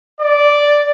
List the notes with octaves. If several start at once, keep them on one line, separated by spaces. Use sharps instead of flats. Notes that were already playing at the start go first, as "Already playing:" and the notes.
D5